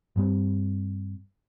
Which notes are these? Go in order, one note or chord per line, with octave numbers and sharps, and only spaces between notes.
G2 G3 C4